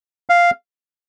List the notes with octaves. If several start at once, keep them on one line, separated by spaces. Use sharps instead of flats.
F5